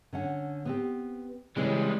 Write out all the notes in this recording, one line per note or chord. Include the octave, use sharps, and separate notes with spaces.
D3 C#4 F#5
B3 C4 G4
C#3 E3 G3 G#3 C4